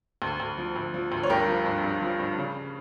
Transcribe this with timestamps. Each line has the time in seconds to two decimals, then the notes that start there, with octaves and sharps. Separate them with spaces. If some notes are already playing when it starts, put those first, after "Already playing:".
0.22 D2
0.40 D2
0.58 F3
0.76 D2
0.94 F3
1.12 D2
1.23 C#5
1.30 G2 G4 A#4
1.48 F3
1.66 G2
1.84 G2
2.02 F3
2.19 G2
2.38 C#3